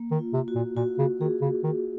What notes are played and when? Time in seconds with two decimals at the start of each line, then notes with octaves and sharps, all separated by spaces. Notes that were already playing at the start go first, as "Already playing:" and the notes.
Already playing: A#3
0.11 D#3
0.19 F4
0.33 C3
0.48 F#4
0.55 A#2
0.76 A#2 F#4
0.99 C#3
1.21 D#3 G#4
1.42 C#3
1.64 D#3